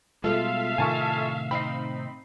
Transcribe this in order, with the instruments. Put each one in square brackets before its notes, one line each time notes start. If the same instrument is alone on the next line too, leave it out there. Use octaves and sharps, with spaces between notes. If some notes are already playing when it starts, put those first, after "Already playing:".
[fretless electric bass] B2 G3 G#3 [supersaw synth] F4 A4 [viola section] E5 F5
[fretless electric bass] A2 C3 D#3 [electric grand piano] G#5 A5 C#6
[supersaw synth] C4 D#4 [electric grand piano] B5 C7